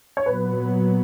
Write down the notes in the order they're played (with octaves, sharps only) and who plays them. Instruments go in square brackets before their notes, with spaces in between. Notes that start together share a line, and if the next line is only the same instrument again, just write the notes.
[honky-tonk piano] C#5
[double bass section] A#2 F#3 B3 [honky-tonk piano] B4